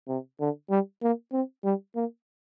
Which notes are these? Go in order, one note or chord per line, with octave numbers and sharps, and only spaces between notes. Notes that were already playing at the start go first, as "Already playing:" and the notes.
C3
D3
G3
A#3
C4
G3
A#3